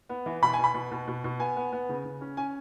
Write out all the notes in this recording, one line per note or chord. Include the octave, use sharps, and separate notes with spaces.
B3
E3
B2 B5
G#5
B2
B5
B2
B2
B2
B2
B3 G#5
B3
B3
C#3
C#3
C#4
C#4 G#5